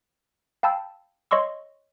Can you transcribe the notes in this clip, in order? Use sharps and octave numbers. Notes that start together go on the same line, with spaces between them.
F5 G5 A5 B5 E6
C#5 D#5 C6 C#6 E6